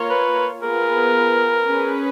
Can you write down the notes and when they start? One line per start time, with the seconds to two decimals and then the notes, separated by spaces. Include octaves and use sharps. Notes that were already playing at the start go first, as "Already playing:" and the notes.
Already playing: A#3 F4 A#4 C#5
0.10 B4
0.62 B3 F4 G#4 A#4 B4
1.67 C#4 G#4 B4